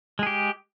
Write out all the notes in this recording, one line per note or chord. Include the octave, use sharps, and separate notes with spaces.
G#3 G4 G#4